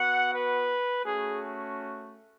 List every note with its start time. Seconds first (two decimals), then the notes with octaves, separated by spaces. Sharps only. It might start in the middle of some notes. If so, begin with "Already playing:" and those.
Already playing: B3 F#4 F#5
0.33 B4
1.04 A3 C#4 F#4 G#4